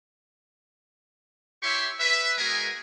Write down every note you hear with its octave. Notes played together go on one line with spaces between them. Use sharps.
E4 G4 C#5 E5 C6 C#6
B4 E5
G#3 B3 F#4 G#4 A#4 G#5